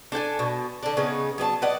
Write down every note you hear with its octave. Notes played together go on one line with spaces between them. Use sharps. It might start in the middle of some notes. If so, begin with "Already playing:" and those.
D4 A4 G5 G#5
B2
D3 D4
C#3 B3 C#4 D#4
F#3 B3 D5 A5
B4 D5 D#5 F#5